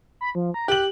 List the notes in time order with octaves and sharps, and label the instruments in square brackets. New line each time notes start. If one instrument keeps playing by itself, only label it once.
[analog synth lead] B5
F3
A#5
[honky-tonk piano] G4 F#7 [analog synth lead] F#6